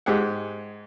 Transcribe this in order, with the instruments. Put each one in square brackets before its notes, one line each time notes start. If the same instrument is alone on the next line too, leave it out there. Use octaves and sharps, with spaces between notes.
[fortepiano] G#2 G4 G#4 F#5